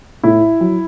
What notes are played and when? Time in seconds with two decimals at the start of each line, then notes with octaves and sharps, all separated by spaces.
0.23 A2 E4
0.61 F#3